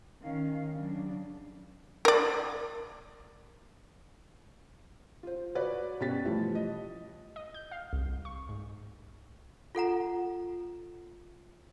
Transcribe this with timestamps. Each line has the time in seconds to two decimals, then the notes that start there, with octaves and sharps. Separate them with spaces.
0.21 D#3 C#4 F5
0.72 C#3 F#3 D4
2.05 A#4 D5
5.23 F4 C5
5.55 F#4 B4 C#5 D5 F#6
6.00 B2 C#4 G4 A6 B6
6.25 E3 F3 G3 A3 E4
6.55 D#5
7.36 D#5
7.54 G6
7.71 F5
7.93 C2
8.25 C#6
8.49 G#2
9.75 F4 A4 F#5 A#5